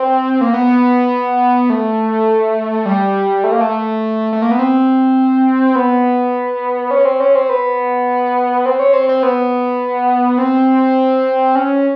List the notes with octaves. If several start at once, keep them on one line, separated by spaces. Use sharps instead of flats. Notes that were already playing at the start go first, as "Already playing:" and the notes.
Already playing: C4
A#3
B3
A3
G3
A3
A#3
A3
A3
A#3
B3
C4
B3
C#4
C4
C#4
C4
B3
C4
C#4
C4
C4
B3
C4
C#4